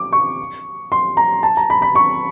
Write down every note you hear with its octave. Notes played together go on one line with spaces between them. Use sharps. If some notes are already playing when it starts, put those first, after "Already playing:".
Already playing: D6
C#6
C6
A#5
A5
A#5
B5
B5
C#6